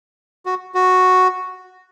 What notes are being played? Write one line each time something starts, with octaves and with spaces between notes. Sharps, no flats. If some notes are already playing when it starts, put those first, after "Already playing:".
F#4
F#4